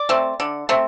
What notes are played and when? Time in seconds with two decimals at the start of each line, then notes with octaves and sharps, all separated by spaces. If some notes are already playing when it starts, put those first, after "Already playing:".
Already playing: D5
0.09 A3 C4
0.40 D3
0.69 A3 C4